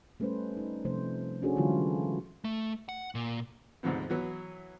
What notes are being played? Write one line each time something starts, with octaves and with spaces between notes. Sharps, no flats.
G3 A3 C#4 B4 C5
D#4
C3 F3 A3 C5
C#4 D4 F#4 G#4 A4 C5
D3 E3 F#3 G#3 E4 F4
A3
F#5
A#2
D2 G#2 C3 F3 B3 C4
E3 F#3 B3 F#4